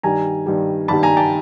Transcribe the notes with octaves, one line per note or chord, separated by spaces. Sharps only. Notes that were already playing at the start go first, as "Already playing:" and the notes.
G2 D#3 G3 G#5 A#5
G2 D#3 G3
G2 D#3 G3 A5 B5
G#5 A#5
G5 A5